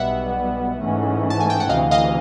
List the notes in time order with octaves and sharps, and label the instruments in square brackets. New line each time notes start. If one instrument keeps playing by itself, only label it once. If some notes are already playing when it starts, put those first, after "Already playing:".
Already playing: [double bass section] B1 B2 G3 B3 [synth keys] E5 F#5
[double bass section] G#2 E3 A3 C#4
[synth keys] A5
G#5
G5
F#5
[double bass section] D2 C3 E3 [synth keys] D#5 F5
[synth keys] D#5 F5